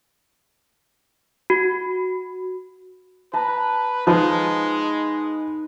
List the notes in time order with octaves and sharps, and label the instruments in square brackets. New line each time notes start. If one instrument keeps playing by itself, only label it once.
[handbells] F#4
[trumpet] B4 [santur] A5 A#5
[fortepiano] F3 [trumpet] G#3 [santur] D#4 B4 D#5